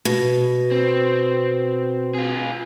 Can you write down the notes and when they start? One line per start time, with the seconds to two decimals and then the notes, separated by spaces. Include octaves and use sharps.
0.05 B2
0.72 C4
2.15 F4 G#4